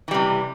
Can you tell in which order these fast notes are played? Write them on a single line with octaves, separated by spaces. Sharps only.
E3 G3 C3